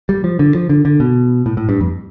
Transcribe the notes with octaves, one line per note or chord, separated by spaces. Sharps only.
G3
F3
D3
F3
D3
D3
B2
A2
A2
G2
F2